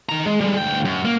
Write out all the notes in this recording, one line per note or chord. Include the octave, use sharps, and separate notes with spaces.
D#3 A#5
G#3
G3 G#3
D2 G5
F#2
A#3